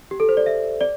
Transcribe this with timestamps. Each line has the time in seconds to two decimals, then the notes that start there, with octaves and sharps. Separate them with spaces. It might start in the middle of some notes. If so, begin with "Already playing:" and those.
0.11 G4
0.20 A4
0.29 C5
0.37 D5
0.46 E5
0.81 D5